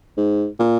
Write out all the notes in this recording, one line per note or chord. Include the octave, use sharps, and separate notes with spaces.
G#2
A#2